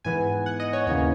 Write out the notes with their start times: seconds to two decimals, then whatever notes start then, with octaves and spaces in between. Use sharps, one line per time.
0.04 G#2 E3 B3 G#5
0.46 F#5
0.60 D#5
0.73 C#5
0.87 D#2 C#3 E3 A#3 C#4 C#5